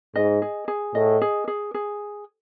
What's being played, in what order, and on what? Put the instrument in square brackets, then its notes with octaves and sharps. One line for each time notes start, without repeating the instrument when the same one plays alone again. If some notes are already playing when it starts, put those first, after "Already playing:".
[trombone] G#2 [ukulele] D#5
[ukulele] G#4
G#4
[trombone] A2 [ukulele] D#5
[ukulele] G#4
G#4
G#4